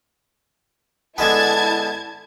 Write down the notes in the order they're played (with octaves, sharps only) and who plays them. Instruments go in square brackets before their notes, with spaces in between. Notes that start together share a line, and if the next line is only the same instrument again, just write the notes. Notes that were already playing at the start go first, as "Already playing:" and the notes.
[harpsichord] D3 G#3 B3 [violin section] E4 A5 G#6